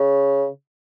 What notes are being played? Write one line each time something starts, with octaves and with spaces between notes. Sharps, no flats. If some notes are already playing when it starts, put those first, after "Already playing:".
Already playing: C#3